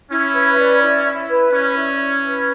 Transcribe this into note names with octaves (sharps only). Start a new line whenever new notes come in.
C#4 E4
B4
D5
E4
E4
B4
C#4 D5
E4
E4
B4